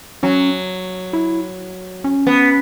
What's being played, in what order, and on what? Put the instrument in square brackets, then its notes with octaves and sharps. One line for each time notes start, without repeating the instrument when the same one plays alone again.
[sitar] F#3 [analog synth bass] C#4
[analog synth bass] E4
C#4
[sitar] B3